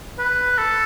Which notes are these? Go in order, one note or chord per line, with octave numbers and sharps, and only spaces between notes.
B4
A4